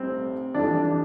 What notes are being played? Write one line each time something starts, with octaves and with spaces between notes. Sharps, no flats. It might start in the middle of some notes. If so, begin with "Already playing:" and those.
Already playing: B1 A2 G3 C4
F2 E3 G3 D4
D4